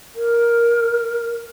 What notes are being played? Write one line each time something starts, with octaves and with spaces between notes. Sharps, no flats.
A#4